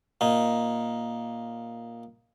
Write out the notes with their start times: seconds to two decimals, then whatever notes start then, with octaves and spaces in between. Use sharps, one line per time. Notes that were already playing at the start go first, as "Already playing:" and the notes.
0.21 A#2 D#4